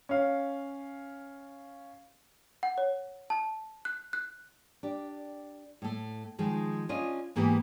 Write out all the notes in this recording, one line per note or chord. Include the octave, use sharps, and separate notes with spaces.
C#4 F5
F#5
C#5
A5
F#6
F#6
D4 G4
A2 A3
D#3 F3 G#3
C#4 D4 F4 D#5
G#2 E3 A#3 B3 G4 B4